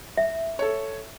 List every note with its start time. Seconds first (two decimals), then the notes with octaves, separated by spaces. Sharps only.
0.17 E5
0.59 A4 C#5